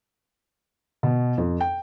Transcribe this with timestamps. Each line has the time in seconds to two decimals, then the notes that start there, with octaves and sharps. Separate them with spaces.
1.03 B2
1.38 F2
1.61 G5